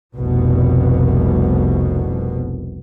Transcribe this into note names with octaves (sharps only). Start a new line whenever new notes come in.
F1 C2 B2